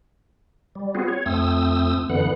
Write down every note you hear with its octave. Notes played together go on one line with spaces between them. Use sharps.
G3
B3 C4 F4 F#4 G#4
C#5
F2 A3 C4 D#6 E6
F#2 D3 E3 B3 F#5